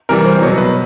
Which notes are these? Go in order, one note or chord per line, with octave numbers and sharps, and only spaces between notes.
C3 E3 G3 A#4
C5
B2 F#3 C#5
B4